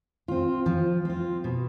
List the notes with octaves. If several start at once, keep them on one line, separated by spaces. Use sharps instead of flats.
C4 F4
F3
C4 F4
B2